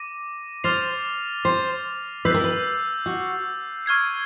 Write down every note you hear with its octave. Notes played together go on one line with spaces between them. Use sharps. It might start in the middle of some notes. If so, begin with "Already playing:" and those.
Already playing: D6 A#6 D#7
C5 D6 F6 A6 C7 F7
C5
B4 E6 G6 C7
A#4
B4
F#4
C#6 F6 G#6 C7